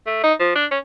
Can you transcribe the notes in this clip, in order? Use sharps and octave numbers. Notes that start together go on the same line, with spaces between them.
A3
D#4
F3
D4
C#4